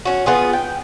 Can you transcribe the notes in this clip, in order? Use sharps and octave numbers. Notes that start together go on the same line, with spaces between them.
C#4 F#4
B3 F4 G#4
G5